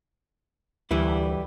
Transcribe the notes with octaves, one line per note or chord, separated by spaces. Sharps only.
D2 E3 G3 E4